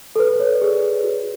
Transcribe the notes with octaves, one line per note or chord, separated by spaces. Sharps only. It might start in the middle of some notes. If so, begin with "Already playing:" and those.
A4
B4
B4
C#5
D5
G#4
F#4